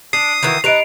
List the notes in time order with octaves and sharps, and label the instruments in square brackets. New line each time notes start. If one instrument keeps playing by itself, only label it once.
[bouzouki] D4 [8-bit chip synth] D#6 [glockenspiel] C7
[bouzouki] D#3 E3 F#4
[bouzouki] D#4 B4 [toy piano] G4 D#5 [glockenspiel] D7 F7